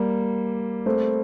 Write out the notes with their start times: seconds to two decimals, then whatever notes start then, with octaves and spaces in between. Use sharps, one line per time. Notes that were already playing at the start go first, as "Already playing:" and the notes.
Already playing: G3 A#3
0.86 A3 C4